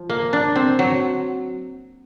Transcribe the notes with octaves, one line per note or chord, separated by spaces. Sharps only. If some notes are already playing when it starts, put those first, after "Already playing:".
Already playing: F3
A#3
D4
C4
F#3